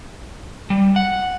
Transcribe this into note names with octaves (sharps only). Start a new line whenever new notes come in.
G3
F#5